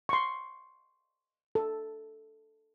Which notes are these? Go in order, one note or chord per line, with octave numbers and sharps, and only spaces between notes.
C6 C#6
A4